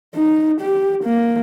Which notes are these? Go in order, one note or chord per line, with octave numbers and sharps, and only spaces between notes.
D#4
G4
A#3